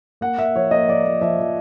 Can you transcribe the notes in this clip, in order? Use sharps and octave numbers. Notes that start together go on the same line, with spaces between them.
A#3 F#5
A#3 E5
F3 C#5
A#3 D#5
F3 D5
A#3
F3 E5
F3